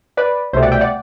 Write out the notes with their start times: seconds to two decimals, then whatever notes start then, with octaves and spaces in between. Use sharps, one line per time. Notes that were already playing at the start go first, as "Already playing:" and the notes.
0.17 B4 D5
0.53 C2 B2 A3 C4 C5 E5
0.63 D5 F#5
0.72 E5 G5
0.81 D5 F#5